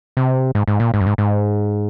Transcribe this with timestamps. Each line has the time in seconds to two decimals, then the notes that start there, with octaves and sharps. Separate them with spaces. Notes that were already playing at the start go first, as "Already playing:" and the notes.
0.17 C3
0.55 G#2
0.68 G#2
0.80 A#2
0.94 G#2
1.01 F#2
1.06 G#2
1.18 G#2